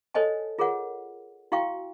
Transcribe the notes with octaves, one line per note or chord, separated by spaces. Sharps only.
A4 C5 C#5 D#5 G#5 A5
F4 G#4 A#4 C#5 F#5
E4 F#4 F5 G5 C#6